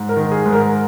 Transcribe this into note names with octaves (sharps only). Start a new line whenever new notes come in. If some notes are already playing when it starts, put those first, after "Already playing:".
Already playing: G#2
A#4
D#3
G#4
G#2
A#4